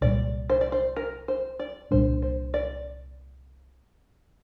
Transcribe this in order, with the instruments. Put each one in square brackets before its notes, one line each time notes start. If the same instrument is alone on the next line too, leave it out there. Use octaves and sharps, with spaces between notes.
[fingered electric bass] C2 A#2 G3 [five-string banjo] D5
[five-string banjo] C5
D5
C5
A#4
C5
D5
[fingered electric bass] C2 A#2 G3 D4 [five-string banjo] C5
[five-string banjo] C5
D5